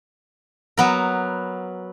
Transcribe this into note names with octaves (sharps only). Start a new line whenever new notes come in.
F#3 B3 A#4